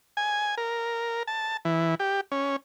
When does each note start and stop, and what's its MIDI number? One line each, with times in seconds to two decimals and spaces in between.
0.17 0.55 80
0.57 1.23 70
1.27 1.57 81
1.65 1.95 52
2.00 2.21 67
2.32 2.56 61